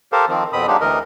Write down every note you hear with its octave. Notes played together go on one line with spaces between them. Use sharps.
G4 A4 A#4 C5 F5
D#3 F3 C4
F2 B2 C4 B5 D#6
F#3 G#3 A#3 D4 D#4 G4
D2 E3 A#4 D#5